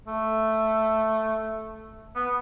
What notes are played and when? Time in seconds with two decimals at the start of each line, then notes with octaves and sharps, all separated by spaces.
0.07 A3
2.15 B3